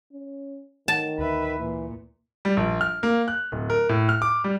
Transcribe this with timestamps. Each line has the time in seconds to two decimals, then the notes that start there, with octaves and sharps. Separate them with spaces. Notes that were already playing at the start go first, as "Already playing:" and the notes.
0.13 C#4
0.88 D#3 A5
1.19 D2 B4 E5
1.59 A#2 E3
2.45 G3
2.57 A#1
2.81 F6
3.03 A#3
3.28 F#6
3.52 D1
3.70 A#4
3.89 A2
4.09 F6
4.22 D6
4.44 G3